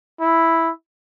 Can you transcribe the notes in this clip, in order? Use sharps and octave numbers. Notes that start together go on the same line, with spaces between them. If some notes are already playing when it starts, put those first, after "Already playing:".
E4